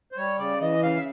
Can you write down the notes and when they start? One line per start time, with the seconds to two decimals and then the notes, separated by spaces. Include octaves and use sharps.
0.12 C5
0.17 G3 C#5
0.38 C#3 D5
0.61 E3 D#5
0.83 C#3 F5
0.96 E5